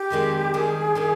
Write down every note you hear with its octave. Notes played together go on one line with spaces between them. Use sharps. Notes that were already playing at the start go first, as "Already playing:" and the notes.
Already playing: G4
F2 D#3 G#3 D4
D#3 G3 D4 G#4
D#3 G3 D4